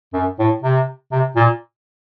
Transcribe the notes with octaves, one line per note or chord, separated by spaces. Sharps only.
F#2
A2
C3
C3
A#2